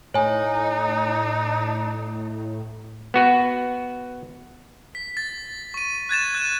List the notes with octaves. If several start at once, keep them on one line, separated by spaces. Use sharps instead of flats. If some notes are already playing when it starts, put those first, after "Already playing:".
A2 D#4 C#5 G#5
B3 F#4 B4
B6
A6
C#6 D#7
F#6 G#6 A6 E7
F#6 D#7